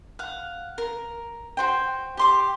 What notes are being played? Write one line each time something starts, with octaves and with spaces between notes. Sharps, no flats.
F5 F#5
A#4
F#4 C5 G5
G4 C6 D6